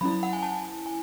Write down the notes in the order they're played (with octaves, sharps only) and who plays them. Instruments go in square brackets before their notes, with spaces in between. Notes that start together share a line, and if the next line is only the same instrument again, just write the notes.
[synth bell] F#3 C#4 E4 B5
F#5
G#5
A5
G#5